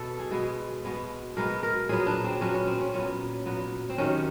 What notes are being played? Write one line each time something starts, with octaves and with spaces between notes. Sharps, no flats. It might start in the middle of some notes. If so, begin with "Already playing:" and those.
Already playing: B2 B3 A4
G#4
B2 G#3 B3 G#4
B2 G#3 B3
B2 G#3 B3 A#4
A#4
A#2 F#3 B3 G#4
D4
C4
A#2 F#3 B3 C#4
C#4
C4
C#4
A#2 F#3 B3 C#4
A#2 F#3 B3
C4
C3 D#3 F#3 C#4